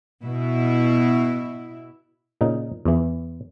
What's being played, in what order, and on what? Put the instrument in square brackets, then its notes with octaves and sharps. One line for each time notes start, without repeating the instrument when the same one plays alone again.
[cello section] B2 E4
[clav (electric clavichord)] A#2 C#3 D#4
E2 E3